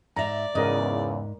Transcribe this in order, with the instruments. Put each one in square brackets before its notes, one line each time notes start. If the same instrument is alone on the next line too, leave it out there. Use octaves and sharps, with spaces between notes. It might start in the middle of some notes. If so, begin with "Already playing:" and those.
[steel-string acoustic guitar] G#2 E5 [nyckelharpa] D5 [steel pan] A#5
[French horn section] E2 C#3 [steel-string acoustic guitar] G#2 [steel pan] A#4 D#5